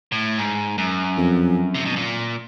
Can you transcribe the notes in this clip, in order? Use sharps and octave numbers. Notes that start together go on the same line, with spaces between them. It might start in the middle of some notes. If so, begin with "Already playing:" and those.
A2
G#2
F#2
F2
C3
B2
A#2